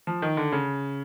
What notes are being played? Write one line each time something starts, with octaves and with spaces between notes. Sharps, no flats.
F3
D#3
D3
C#3